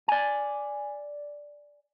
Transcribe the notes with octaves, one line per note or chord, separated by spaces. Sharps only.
D5 G#5